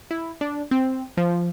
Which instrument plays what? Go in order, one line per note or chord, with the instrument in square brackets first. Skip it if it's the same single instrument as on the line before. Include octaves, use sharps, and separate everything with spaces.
[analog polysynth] E4
D4
C4
F3